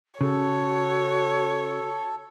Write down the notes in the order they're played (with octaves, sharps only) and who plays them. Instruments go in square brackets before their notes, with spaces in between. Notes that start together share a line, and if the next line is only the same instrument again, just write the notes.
[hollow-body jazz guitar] C#3 [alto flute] F#4 [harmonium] A4 [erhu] C#5